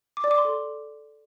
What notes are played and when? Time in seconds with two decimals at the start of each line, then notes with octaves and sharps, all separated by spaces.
0.17 D6
0.24 D5
0.31 D6
0.38 C6
0.45 A4